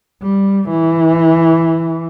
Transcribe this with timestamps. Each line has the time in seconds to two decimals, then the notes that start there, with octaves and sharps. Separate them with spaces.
0.22 G3
0.69 E3